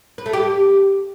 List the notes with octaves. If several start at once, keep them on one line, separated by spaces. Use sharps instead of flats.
B4
A3
G4